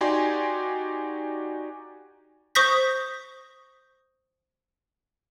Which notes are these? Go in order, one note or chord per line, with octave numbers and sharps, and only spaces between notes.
D#4 F#4 G4 D5 G#5 C6
C5 C#6 D#6 G6 A#6 B6